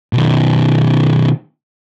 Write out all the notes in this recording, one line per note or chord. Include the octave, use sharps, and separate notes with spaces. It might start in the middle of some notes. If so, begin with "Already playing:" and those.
B2 D#3